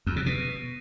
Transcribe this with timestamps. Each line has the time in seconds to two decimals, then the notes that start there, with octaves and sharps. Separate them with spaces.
0.07 F2
0.16 C3
0.26 B2